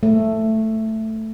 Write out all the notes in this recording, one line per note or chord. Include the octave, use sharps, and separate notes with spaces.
A3